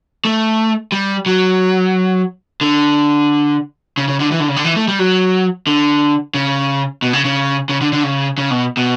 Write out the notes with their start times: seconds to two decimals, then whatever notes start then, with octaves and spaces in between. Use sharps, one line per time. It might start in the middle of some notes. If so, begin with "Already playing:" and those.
0.25 A3
0.92 G3
1.26 F#3
2.61 D3
3.97 C#3
4.08 C#3
4.20 D3
4.31 E3
4.40 D3
4.48 C#3
4.56 D3
4.65 E3
4.76 A3
4.88 G3
4.99 F#3
5.67 D3
6.34 C#3
7.02 B2
7.13 C#3
7.25 C#3
7.69 C#3
7.81 D3
7.93 D3
8.03 C#3
8.38 C#3
8.51 B2
8.77 B2